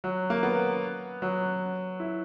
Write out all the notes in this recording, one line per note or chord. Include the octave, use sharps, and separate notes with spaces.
F#3
A#3
B3
F#3
E4